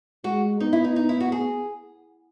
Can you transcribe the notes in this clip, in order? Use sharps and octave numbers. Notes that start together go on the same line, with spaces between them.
G#3 F#4
B3 D#4
E4
D#4
D#4
E4
F#4
G#4